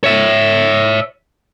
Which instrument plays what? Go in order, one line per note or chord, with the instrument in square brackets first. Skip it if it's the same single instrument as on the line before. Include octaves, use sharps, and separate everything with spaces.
[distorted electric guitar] C#5 E5